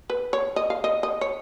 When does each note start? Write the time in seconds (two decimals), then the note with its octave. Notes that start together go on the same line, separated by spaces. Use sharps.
0.10 B4
0.33 C#5
0.56 D#5
0.70 F5
0.84 D#5
1.03 D#5
1.21 C#5